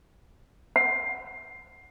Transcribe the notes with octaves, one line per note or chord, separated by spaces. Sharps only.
F#5